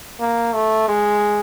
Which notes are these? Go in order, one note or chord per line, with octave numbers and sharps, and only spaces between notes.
A#3
A3
G#3